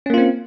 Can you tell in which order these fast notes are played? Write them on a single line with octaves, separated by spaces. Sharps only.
C#4 A#3 F4 C4